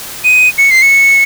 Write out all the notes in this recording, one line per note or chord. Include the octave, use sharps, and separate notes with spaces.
D#7
C#7
C7
C#7